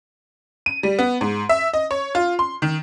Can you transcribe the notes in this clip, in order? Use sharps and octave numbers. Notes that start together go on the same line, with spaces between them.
D#7
G3
B3
G#2
E5
D#5
C#5
F4
C6
D#3